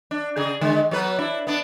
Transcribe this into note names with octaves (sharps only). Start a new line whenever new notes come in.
D4
C#3 G#4
D3 G#3
F#3 B3 B4
D4 E4
B3 D4